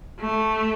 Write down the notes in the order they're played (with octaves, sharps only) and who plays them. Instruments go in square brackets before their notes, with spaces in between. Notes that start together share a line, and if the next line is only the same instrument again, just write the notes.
[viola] A3